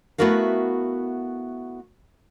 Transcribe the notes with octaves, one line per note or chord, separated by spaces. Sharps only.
A3 B3 E4 F#4 A#4 F5